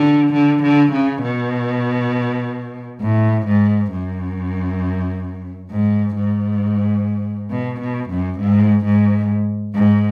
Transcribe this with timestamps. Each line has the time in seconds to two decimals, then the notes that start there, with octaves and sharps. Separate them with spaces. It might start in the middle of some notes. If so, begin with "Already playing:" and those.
Already playing: D3
0.33 D3
0.63 D3
0.92 C#3
1.22 B2
3.01 A2
3.46 G#2
3.91 F#2
5.71 G#2
6.16 G#2
7.50 B2
7.80 B2
8.10 F#2
8.40 G#2
8.85 G#2
9.75 G#2